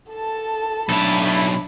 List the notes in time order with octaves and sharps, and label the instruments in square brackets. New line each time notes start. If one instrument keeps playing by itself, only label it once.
[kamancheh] A4 A5
[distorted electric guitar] B1 A5 [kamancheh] D4 B5 [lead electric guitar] E4 A4